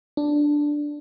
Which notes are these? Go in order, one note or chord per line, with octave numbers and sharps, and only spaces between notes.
D4